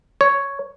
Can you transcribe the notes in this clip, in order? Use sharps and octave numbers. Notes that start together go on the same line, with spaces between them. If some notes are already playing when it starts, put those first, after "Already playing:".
C#5